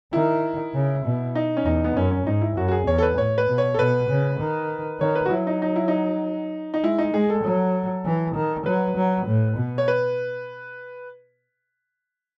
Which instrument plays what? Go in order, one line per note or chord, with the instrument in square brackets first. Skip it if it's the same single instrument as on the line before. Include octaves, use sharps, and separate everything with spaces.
[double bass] D#3 [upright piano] E4
[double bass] C#3
B2
[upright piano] D#4
C#4
[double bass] E2 [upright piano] D#4
[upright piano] B3
[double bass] F#2 [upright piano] C#4
[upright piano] C#4
[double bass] G#2 [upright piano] D#4
[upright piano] E4
[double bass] F#2 [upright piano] F#4
[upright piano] F#4
G#4
[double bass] E2 [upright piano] C#5
[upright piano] A4
B4
[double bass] A2 [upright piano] C#5
[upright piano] B4
[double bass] B2
[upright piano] C#5
A4
[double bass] B2 [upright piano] B4
[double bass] C#3
D#3
[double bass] D#3 [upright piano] C#5
[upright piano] B4
F#4
[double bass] F#3 [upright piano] E4
[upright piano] D#4
D#4
E4
D#4
D#4
[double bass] G#3 [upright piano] E4
[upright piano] D#4
[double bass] G#3 [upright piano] G#4
[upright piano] A4
[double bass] F#3
E3
D#3
[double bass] F#3 [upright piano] B4
[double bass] F#3
A2
B2
[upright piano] C#5
B4